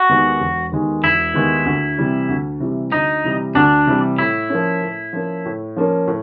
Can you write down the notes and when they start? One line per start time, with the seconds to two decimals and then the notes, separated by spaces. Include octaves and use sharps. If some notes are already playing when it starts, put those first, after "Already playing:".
Already playing: F#4
0.09 D#2 D#3 G#3 B3
0.40 E1
0.72 D#2 D#3 G#3 B3
1.03 E1 E4
1.34 D#2 D#3 G#3 B3
1.66 D2
1.98 C3 E3 G3
2.29 D2
2.60 C3 E3 G3
2.92 D2 D#4
3.25 C3 E3 G3
3.55 D2 D4
3.87 C3 E3 G3
4.19 A2 E4
4.50 F3 A#3 C#4
4.81 A2
5.13 F3 A#3 C#4
5.45 A2
5.76 F3 A#3 C#4
6.07 A2